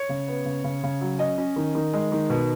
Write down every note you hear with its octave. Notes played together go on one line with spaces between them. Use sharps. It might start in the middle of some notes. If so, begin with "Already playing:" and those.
Already playing: C#5
C#3
B3
C#3
C#3
C#3
F#3
C#4 D#5
C#4
D#3
D#3
G#3
D#3
B2